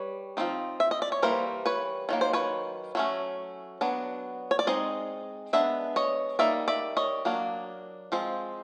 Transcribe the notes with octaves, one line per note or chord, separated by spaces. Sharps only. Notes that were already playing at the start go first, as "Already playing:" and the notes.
Already playing: G3 B4 C#5
F3 A3 C4 D#4
E5
D#5
D5
C#5
E3 G3 A#3 A#4 C5
B4 C#5
D#3 F#3 A#3
C5
B4 C#5
F#3 A3 C#4
F#3 B3 D4
C#5
D5
G#3 C4 D#4 D#5
G#3 B3 D4 E5
C#5 D#5
G3 A#3 D#4 D5 E5
D5 E5
C#5 D#5
F#3 A#3 D4
F3 G#3 C4